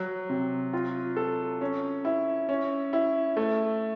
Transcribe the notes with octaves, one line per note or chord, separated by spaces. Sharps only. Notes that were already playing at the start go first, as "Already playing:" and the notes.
Already playing: F#3
C3
F4
A4
C#4
E4
C#4
E4
A3